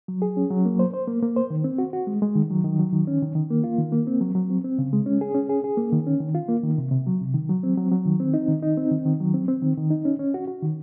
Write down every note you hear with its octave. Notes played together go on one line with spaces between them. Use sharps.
F#3
G#4
C#4
F#3
A#3
C5
C5
A#3
A#3
C5
D#3
C4
F#4
F#4
G#3
G#3
D#3
F#3
D#3
F#3
D#3
C#4
D#3
D#3
A#3
F4
D#3
A#3
C4
F#3
F#3
C4
C4
C#3
G#3
C#4
G#4
C#4
G#4
G#4
A#3
D#3
C#4
D#3
F4
A#3
D#3
C3
C3
F#3
C3
D#3
F#3
C4
F#3
F#3
D#3
C4
D#4
D#3
D#4
C4
D#3
D#3
F#3
C4
C4
D#3
D#3
D#4
C#4
C#4
F#4
F#4
D#3